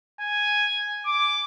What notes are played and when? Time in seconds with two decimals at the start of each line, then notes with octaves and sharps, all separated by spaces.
0.20 G#5
1.06 D6